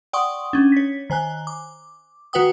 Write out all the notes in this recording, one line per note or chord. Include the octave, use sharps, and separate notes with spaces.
D5 F#5 G5 C6 C#6 D#6
C#4 D4
C#5 B6
D#3 C5 G#5 F#6
D6
D#3 F#4 B4 F#5 G5 D#6